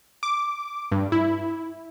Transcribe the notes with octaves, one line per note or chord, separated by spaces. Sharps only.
D6
G2
E4